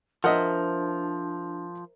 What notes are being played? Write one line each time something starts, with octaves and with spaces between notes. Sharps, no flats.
F3 D4 A#4 C5 D#5 E5 F#5